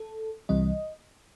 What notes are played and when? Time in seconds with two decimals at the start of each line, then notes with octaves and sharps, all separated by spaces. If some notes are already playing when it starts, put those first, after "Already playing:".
Already playing: A4
0.49 C2 C3 E3 G3 C4 D#5